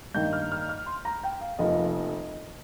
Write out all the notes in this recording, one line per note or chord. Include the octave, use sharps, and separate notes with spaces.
G2 D#3 A#3 D#4 G6
F6
F6
F6
C6
A#5
G5
F5
F1 F2 F3 A#3 D#5